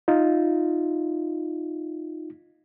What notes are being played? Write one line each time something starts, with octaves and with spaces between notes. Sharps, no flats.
D#4 F4